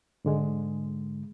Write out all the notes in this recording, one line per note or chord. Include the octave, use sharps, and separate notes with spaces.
G#2 D3 G#3